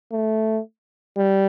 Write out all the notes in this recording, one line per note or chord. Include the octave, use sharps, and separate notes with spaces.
A3
G3